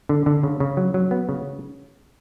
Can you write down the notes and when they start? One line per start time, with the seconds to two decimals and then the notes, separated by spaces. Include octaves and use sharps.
0.09 D3
0.26 D3
0.43 C#3
0.60 C#3
0.77 F#3
0.94 F#3
1.11 B3
1.29 C#3